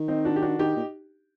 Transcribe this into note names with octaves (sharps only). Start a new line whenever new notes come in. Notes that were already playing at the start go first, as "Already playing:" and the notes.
Already playing: D#3
C4 D#4
D4 F#4
G4
D4 F#4
D#3 D#4 G4
A#2